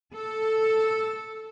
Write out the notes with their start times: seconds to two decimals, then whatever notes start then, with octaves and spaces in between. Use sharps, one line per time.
0.15 A4